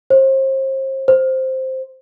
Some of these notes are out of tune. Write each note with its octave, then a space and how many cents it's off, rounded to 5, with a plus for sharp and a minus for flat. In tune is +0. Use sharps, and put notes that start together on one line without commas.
C5 +35
C5 +0